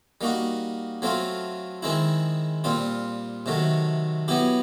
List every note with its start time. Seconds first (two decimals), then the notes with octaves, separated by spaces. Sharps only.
0.21 G3 A#3 D#4 F#4
1.02 F#3 A3 C4 F4
1.82 D#3 G#3 C4 E4
2.64 A#2 G3 C4 F4
3.46 C3 D#3 F#3 A3
4.28 F#3 B3 E4 G4